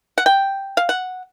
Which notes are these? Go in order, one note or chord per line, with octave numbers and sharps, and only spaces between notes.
F#5
G5
F5
F#5